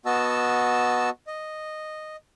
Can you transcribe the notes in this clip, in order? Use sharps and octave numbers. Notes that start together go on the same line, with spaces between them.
B3 F#4 D#5 A5 E6
D#5